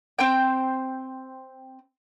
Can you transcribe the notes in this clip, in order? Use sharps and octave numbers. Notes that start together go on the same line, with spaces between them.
C4 C5 G5